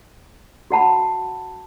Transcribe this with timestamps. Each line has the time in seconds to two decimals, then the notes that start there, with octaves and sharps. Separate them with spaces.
0.70 F#4 F#5 A5 B5